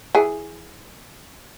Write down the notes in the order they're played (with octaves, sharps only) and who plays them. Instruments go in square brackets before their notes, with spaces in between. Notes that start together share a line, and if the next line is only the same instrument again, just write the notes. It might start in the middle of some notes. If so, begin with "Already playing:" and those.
[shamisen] E3 G#4